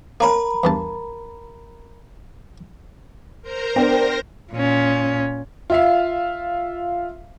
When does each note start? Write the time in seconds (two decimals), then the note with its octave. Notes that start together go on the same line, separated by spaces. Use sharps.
0.20 A#3 C#4 A#4 A#5 B5
0.64 E2 G2 A5
3.42 A#4 C5 A#5
3.76 B3 D4 G5
4.52 A#2 C#4
5.70 F4 E5 F5